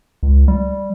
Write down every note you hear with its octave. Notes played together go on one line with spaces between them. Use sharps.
C#2
G3